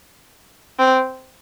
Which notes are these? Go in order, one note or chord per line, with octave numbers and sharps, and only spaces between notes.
C4